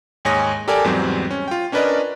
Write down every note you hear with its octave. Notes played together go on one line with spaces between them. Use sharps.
D#2 G#2 C#5 G#5 D#6 A#6
G4 A4 A#4 D5 G#5 A5
E2 G#2 F#3 G3 C4
C#4
F4 G5
C#4 D4 A#4 B4 D5 D#5